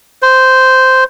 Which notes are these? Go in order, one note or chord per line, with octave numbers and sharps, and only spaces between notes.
C5